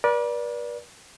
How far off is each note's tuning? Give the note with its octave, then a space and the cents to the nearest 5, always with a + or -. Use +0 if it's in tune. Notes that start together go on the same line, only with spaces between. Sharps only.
B4 -45 D5 -5